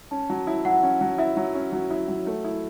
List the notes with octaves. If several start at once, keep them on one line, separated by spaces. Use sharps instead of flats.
C#4 A5
F#3
E4
F#3 F#5
C#4
F#3
E4 E5
F#3
C#4
F#3
E4
F#3
A3
E4